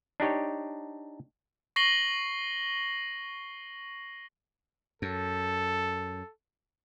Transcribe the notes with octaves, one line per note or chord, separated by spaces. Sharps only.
D4 D#4 G4 C#5
C#6 A#6 C7 F#7 G7
F#2 A4